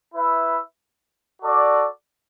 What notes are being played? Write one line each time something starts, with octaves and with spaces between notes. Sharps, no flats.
E4 B4 E5
F#4 A4 D5